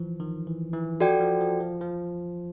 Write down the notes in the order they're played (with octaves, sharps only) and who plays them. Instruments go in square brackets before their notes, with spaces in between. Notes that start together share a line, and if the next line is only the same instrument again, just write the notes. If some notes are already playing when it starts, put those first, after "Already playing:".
Already playing: [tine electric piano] E3 F3
D#3
E3
E3
[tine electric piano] F3 [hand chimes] F#4 A4 D5 G5
[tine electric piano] F3
F3
F3
F3